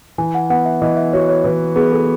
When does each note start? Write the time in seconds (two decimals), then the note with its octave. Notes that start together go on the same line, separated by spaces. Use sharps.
0.18 E3 G#5
0.35 F#5
0.50 B3 F#5
0.65 E5
0.82 E3 D#5
0.97 E5
1.13 F#4 C#5
1.29 C#5
1.44 E3 B4
1.76 B3 G#4
1.92 A4